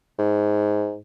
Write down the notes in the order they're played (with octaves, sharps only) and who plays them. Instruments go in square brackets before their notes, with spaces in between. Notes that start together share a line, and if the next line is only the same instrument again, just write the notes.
[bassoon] G#2